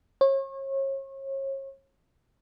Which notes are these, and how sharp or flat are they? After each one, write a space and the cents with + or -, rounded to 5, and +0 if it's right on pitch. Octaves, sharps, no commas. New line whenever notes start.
C#5 -35